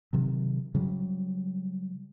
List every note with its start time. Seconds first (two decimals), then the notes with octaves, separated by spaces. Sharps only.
0.13 C3 D#3 F#3
0.75 C#3 F#3 G3